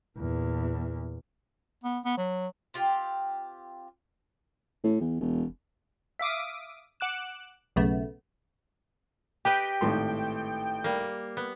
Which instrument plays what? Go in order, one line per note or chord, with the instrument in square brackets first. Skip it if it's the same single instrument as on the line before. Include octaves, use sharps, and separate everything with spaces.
[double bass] E2 A#2
[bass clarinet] B3
B3
F#3
[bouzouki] C4 F4 G4 G5
[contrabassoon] A2
E2
E1
[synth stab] E5 F5 D6 D#6
F#5 D6 F#6 E7
B1 F#2 C#3 A3 B3
[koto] G4 B4 D#5 [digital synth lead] G5
[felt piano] G#1 A2 C6
[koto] G3 A#3
B3